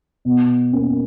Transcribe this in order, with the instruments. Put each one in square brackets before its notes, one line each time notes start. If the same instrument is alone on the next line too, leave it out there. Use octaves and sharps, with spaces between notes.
[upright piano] B2
A#3 C#4